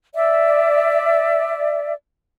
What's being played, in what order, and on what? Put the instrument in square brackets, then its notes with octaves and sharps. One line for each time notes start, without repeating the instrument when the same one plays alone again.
[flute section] D5 E5